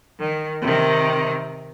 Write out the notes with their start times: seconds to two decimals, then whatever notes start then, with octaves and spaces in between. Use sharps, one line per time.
0.20 D#3
0.62 C3 D#3